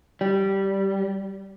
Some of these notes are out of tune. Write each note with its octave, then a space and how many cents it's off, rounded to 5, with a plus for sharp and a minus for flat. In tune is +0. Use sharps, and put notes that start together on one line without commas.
G3 -10